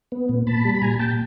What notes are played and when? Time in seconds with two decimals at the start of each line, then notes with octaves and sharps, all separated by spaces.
0.12 B3
0.29 A#2
0.47 A#2 A5 B5
0.65 G3
0.75 B5
0.82 A#2 G#5 A#5
0.99 A#2 G5 A5